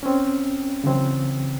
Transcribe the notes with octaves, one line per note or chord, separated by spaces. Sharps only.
C4 C#4
C#3 E3 F#3 C4